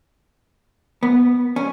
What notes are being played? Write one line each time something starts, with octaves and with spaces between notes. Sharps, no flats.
B3
C#4